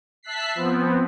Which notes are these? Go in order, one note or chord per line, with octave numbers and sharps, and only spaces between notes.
E5 A5 F#6 B6 C7
F3 B3 C4